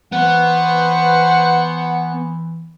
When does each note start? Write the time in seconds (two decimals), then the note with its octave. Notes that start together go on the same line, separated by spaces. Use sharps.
0.12 E3 B3 B4 C5 F#5 C#6